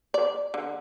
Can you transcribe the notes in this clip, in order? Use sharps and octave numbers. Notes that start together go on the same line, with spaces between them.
D5
D3